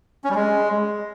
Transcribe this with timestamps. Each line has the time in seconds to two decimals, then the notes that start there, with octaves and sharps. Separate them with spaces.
0.24 C#4
0.30 G3
0.35 G#3